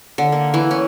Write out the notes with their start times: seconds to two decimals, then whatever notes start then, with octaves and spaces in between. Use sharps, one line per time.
0.18 D3
0.32 A#3
0.54 E3
0.71 C#4